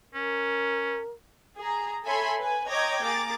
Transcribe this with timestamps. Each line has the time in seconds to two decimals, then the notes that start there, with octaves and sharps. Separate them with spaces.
0.15 C#4 A#4
1.58 G#4 A#5
2.06 A4 C#5 E5 G#5 B5 C6
2.40 B4 G#5
2.69 C#5 D#5 G5 A#5 D6 G#6
3.04 A#3 G#4 A#5 D6 A6